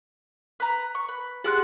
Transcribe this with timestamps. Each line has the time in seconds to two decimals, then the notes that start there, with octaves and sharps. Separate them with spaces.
0.60 B4 A#5
0.95 C#6
1.09 B4
1.44 G4 G#4 F#5 C6 F6 F#6